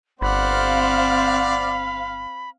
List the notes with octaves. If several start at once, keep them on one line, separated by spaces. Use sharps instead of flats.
G1 C4 C5 D5 F5 F#5 B5